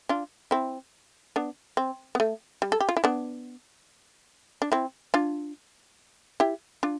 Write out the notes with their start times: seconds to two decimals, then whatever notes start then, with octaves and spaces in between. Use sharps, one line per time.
0.09 D4 F4
0.51 C4 E4
1.36 B3 D4
1.77 C4
2.15 B3
2.20 A3
2.62 G3
2.72 A4
2.80 G4
2.89 F4
2.97 E4
3.04 B3 D4
4.62 D4
4.72 C4 E4
5.14 D4 F4
6.40 E4 G4
6.83 D4 F4